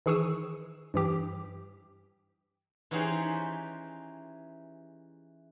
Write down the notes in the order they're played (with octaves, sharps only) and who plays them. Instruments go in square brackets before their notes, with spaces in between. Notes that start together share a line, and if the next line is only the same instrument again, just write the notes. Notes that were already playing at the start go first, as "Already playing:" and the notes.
[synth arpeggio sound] D#3 E3 G#4 C#6 D#6 E6
G2 E3 G4
[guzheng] E3 C#4 D#4 G4 G#4 C5